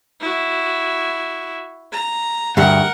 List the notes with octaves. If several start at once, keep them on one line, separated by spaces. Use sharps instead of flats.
E4 F#4
A#5
D2 G2 A#4 F#5